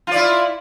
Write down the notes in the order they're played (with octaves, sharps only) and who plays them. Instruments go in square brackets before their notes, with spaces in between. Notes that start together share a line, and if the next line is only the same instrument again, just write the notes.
[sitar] F4
D5
E4